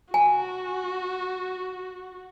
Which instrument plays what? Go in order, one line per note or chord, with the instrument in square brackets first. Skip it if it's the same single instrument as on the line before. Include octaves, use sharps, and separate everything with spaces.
[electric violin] F#4 [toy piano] G#5